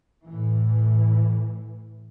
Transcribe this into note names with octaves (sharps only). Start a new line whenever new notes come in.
A2 E3